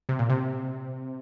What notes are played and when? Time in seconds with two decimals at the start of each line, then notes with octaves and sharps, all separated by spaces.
0.09 C3
0.19 A#2
0.30 C3